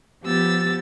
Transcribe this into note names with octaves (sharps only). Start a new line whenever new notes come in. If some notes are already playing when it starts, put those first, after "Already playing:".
F3 B3 G4 E6 A6